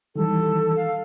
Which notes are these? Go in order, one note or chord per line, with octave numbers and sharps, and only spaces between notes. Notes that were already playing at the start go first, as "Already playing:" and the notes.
D#3 E3 G3 A4
F5